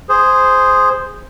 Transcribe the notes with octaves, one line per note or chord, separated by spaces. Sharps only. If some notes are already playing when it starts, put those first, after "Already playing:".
G#4 C5